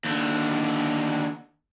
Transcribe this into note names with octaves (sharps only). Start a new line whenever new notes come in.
D#2 D3